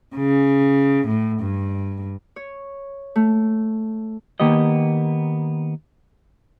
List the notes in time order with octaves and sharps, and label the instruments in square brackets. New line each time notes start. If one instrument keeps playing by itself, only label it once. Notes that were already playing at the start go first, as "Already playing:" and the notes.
[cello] C#3
A2
G2
[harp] C#5
A3
[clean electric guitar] D#3 A#3 B3 G4 D#5